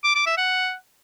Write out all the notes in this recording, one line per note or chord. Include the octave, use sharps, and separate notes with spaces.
D6
D6
E5
F#5